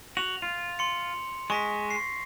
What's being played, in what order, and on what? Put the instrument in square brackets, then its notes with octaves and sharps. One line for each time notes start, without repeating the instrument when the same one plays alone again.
[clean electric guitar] F#4 [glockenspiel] F7
[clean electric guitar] F4
[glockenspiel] C6 C#7
[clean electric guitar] G#3 [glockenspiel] C#6 A#6 B6
[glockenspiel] C7